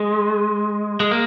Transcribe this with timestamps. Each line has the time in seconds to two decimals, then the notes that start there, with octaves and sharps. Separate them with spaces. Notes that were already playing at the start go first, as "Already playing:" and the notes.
Already playing: G#3
1.00 G#3
1.11 A#3